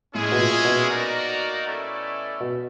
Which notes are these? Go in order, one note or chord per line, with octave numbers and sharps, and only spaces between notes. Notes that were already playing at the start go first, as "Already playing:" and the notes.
A2 G#3 C#4 E4 G#4
B2
A#2
B2
A#3 D#4 F#4 A#4 D5
A3 C#4 E4 A4 D5
B2